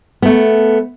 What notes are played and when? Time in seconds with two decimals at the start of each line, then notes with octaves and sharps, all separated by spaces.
0.22 A3 B3